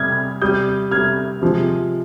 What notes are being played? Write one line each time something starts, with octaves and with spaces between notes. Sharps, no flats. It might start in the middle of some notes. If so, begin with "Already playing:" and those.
Already playing: C3 G3 F6 G#6
C3 G3 D#6 G6
C3 G3 F6 G#6
C3 F3 G#3